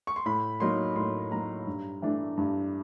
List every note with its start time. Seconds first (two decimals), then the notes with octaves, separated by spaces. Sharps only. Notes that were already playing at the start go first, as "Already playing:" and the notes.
0.07 C#6
0.16 C6
0.26 A2 B5
0.60 F#3 A#3 D#4 C6
0.96 A2 C6
1.32 F#3 A#3 D#4 A#5
1.67 G2
2.02 E3 A3 D4
2.37 G2